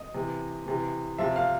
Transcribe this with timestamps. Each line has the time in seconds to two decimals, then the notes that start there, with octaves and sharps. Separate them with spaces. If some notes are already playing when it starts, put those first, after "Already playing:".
Already playing: D#5
0.14 C3 E3
0.66 C3 E3
1.18 C3 F3 E5
1.36 F5